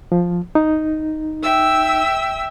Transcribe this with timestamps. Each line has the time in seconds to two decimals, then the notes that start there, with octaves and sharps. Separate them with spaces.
0.12 F3
0.55 D#4
1.42 E5 G5 E6